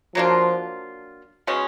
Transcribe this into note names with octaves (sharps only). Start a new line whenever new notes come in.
F3 F#3 A#3 D4 F4
B2 G#3 C#4